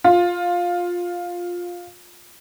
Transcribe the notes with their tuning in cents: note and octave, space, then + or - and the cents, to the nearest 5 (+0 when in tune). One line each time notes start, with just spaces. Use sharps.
F4 +10